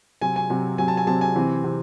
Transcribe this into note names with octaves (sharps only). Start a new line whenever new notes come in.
C3 F#3 C4 G#5
G#5
C3 F#3 C4
C3 F#3 C4 G#5
A5
G#5
C3 F#3 C4 A5
G#5
C3 E3 C4
C3 E3 C4